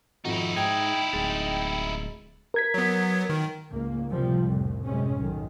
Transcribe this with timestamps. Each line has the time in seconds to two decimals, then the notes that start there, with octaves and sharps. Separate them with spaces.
0.25 G#1 F2 D#4 E4 F#4
0.56 G#2 G5 A#5 D#6 G#6
1.13 D1 G#3 A6
2.54 A#4 G#6 B6
2.74 F#3 B3
3.29 D#3
3.70 C#2 G#2 A#3
4.10 A2 C3 F3 G3
4.47 F1 C2 A2
4.84 F#2 C3 G#3 C#4
5.16 B1 F#2 D#3